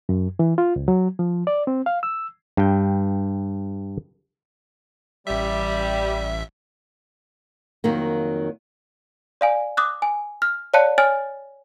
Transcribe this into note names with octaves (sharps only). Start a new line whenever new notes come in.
F#2
E3
F4
C#2
F#3
F3
D5
C4
F5
E6
G2 G5
A1 G3 E5
F2 D#3 F#3 A#3
D5 F5 G#5
D6 D#6 F#6
G#5
F6
C#5 D5 F5 A5 F#6 C#7
C#5 G#5 F6 A6